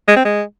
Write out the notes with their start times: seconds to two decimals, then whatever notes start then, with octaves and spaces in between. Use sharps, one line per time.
0.08 G#3
0.16 C4
0.25 G#3